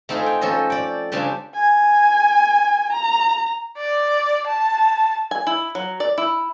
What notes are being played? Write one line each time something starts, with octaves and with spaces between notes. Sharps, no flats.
A3 C4 D#4 F4 G#4
G5
F3 C#4 A4 C5 D#5
D5 G5
C#3 G3 C4 D4 G#5 A5
G#5
A#5
D5
A5
G#5
E4
F#3
D5
E4